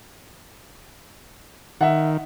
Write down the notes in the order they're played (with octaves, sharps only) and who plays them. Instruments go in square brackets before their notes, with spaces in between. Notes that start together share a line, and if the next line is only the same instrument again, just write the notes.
[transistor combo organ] D#3 [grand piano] E5 F#5